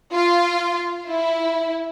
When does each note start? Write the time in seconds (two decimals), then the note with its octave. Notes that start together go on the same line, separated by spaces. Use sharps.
0.13 F4
1.07 E4